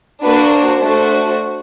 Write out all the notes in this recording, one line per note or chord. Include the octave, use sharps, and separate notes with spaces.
A#3 D4 F#4 B4
C5
A3 D4 F#4